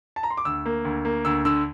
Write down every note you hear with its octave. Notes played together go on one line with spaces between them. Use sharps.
A5
A#5
C6
D6
D2 E6
A#3
D2
A#3
D2 E6
D3 E6